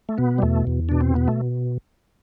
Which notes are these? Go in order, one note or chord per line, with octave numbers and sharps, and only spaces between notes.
A3
B2 B3
G3
E2 A3
E2
B2 D4
C4
B2 B3
A3